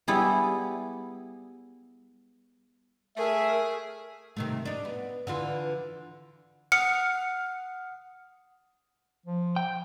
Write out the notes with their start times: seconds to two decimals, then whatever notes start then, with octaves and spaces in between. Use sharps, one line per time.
0.08 G3 B3 E4 G4 G#4
3.17 A3 G#4 A#4 E5
4.36 C3 D#3 A3
4.65 D4 D#4
4.85 B3
5.27 D3 E3 F4
6.72 F#5 D#6 F6 C#7
9.26 F3
9.56 G5